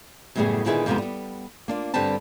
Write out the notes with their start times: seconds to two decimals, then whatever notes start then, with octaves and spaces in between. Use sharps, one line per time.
0.36 F#2 A2 C#3 G3 B3 G#4
0.66 A#2 D3 D#3 E4 G#4 B4
0.86 F2 G#2 C3 F3 A#3 B3
0.98 G3 B3
1.68 A#3 D4 F4
1.94 G2 D3 G3 C4 B4 A5